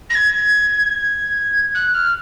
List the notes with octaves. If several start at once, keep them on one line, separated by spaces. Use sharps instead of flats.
A#6
G#6
F#6
F6